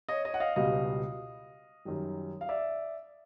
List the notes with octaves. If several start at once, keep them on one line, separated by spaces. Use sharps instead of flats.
C#5 D#5
C#5 D#5
F#5
D#5 F5
C#2 B2 G3 D#5 F5
F#2 D#3 G3
F5
D5 E5